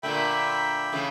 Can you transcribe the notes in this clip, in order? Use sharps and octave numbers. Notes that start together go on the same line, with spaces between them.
A#2 D3 A3 E5 G5 B5
C#3 E3 A3